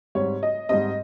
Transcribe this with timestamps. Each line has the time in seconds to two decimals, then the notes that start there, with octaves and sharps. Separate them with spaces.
0.15 G#2 G3 C4 C#5
0.43 D#5
0.69 G#2 G3 C4 D#5